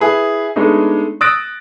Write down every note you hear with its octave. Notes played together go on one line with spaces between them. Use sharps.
E4 G#4 B4
G#3 A3 B3 D4 D#4
D#6 E6 F#6 A6 A#6 D7